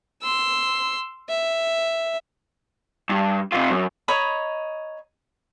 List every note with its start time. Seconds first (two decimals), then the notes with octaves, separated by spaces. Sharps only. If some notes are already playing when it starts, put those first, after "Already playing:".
0.22 C6 E6
1.29 E5
3.09 G2
3.52 C3 F4
3.69 F#2
4.08 C#5 D#5 A#5 B5